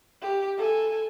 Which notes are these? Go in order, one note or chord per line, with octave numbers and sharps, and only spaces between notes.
G4
A4 G#5